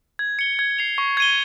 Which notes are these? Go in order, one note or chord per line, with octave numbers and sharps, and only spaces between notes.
G#6
C#7 G7
G#6
C7 F7
C#6
G#6 D#7 G7